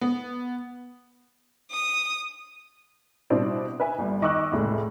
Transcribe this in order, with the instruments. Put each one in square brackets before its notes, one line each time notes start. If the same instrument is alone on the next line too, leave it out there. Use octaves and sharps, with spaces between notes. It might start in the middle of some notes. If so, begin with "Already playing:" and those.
[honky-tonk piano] B3
[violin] D#6
[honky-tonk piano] B2 G3 C4 D4 E4
B4 E5 G#5
G1 G2
D#3 D#5 C#6 D6 E6 F#6
F1 C#2 A2